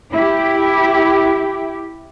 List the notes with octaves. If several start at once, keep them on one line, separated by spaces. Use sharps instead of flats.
E4 G4